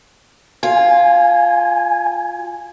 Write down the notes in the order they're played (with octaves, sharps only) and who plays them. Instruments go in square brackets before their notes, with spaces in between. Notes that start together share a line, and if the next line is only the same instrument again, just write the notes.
[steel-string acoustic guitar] F4 [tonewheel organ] G#5